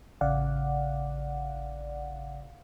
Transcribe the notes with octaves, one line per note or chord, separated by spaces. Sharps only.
A1 C#3 D5 F5 F#5